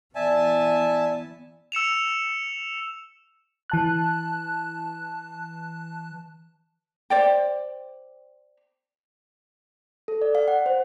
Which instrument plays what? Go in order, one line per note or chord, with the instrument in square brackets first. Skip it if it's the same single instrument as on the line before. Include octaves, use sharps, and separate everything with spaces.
[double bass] E3 B3 [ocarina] D5 [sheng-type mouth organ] E5 G#5 A5
[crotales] E6 C#7 E7 F7
[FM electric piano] E3 A5 F#6
[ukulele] C5 D5 G5
[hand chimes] A4
D5
F5
F#5
C5